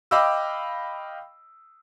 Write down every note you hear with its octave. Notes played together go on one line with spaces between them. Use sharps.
D#5 F5 G5 B5 D6 E6